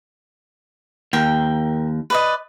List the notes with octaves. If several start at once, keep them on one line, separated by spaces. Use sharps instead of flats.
D#2 A#4 G5
B4 D5 D#5